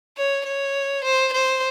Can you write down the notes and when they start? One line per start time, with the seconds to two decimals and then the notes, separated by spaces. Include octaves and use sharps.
0.18 C#5
0.46 C#5
1.04 C5
1.33 C5